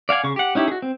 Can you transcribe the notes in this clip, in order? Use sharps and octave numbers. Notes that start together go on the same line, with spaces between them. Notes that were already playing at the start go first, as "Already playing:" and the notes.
D5 F5 F#5 G#5
C#3 C#6
G4 F#5
C#4 D#4 E4 G4
F#4 G#4
C4